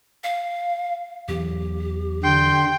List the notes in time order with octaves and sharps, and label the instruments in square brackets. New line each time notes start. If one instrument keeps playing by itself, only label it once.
[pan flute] F5
[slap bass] E2 E3 F#3 [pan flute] G4
[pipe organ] D3 C6 [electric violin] G5